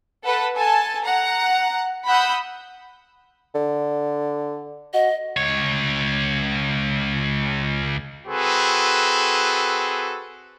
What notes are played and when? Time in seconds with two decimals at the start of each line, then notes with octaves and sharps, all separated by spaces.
0.24 A4 B4 F#5
0.55 A4 G#5 A5
1.04 F#5 A#5
2.07 F#5 B5 D#6 E6 G6
3.55 D3
4.94 F#4 D#5
5.37 C#2 C#5
8.27 C4 F#4 G#4 A4 B4